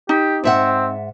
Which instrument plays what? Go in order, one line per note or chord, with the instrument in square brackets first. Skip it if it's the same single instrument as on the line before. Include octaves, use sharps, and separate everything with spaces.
[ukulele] D#4 [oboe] G4
[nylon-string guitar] G#2 E5 F#5 [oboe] C4